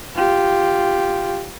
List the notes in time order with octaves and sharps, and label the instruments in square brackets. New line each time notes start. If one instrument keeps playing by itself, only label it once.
[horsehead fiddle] F4 G4